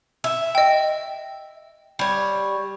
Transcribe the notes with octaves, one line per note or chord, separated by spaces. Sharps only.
E5
D#5 G5
G3 C#5